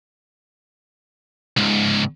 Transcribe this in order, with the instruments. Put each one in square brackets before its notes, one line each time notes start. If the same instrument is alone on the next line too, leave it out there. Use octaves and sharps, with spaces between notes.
[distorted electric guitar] C#2 G#2